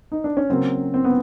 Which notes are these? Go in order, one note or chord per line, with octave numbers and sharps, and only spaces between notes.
D#4
D4
C#4
C#3 F#3 A#3 C4
C4
B3